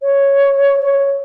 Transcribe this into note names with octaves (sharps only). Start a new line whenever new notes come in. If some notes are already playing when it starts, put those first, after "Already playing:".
C#5
C#5